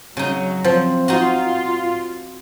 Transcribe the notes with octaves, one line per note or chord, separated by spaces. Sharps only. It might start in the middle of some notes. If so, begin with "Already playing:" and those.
C#3 F#3 D#4
F3 C4
D#4 F4 F#4